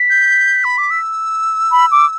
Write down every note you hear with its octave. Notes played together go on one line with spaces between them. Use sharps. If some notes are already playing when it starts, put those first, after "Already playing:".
Already playing: B6
G6
B5
D6
E6
B5
D6